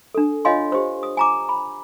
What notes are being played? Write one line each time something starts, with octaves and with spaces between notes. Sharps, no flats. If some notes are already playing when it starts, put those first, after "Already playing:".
D4 A4
F4 C#5 D#5 F5 G#5 C6
G4 C5
D#6
G#5 A#5 D6
B5